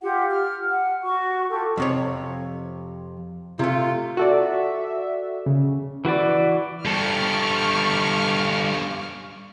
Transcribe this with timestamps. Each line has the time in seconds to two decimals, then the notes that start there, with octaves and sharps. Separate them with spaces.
0.02 F4 G4 F#5
0.29 F6
0.69 F#5
1.03 F#4 C#6
1.50 F4 G4 A4
1.77 F2 C3 C#5
3.59 C3 A3 F4
4.17 F#4 A4 D5 E5
5.46 C#3
6.05 E3 F#4 B4 D5
6.85 G2 F3 G3 A4 C#6 D6 F6